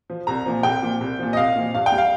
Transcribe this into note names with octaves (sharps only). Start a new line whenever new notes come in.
F3
C2 A#5
A#2 F3
C2 G5
A#2 F3
C2
A#2 F3
D#5
C2 F5
A#2 F3
G2 F5
G5
G3
F5